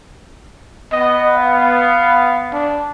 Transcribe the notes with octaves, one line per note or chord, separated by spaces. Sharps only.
B3 D#5
F5
D4